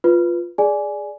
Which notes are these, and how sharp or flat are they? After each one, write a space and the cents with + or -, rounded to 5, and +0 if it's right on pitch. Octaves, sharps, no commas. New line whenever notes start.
F4 +0 B4 +0
G#4 +0 D5 +0 G#5 +10